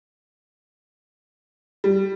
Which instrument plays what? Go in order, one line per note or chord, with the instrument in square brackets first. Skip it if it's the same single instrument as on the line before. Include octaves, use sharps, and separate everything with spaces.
[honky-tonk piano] G3